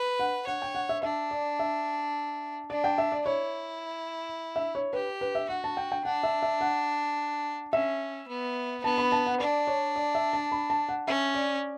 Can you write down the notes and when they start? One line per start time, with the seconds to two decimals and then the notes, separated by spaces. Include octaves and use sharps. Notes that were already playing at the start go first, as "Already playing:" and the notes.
Already playing: B4
0.19 F#5
0.47 C#5 F#5
0.62 G5
0.75 F#5
0.89 E5
1.03 D4 E5
1.31 D5
1.59 E5
2.70 D4 D5
2.84 G5
2.98 E5
3.12 D5
3.26 E4 C#5
4.56 E5
4.75 C#5
4.93 G4 B4
5.21 B4
5.35 E5
5.49 F#4 F#5
5.64 A5
5.77 G5
5.92 G5
6.05 D4 F#5
6.23 E5
6.42 E5
6.61 F#5
7.73 C#4 E5
8.28 B3
8.84 B3 A5
8.98 B5
9.12 A5
9.26 F#5
9.40 D4 D5
9.67 C#5
9.96 D5
10.15 E5
10.33 A5
10.52 B5
10.70 A5
10.89 F#5
11.07 C#4 E5
11.35 D5